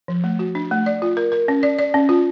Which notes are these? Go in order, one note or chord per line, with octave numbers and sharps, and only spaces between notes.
F3
A3
F#4
D4
A3
D5
F4
A#4
A#4
C#4
D5
D5
C#4
F4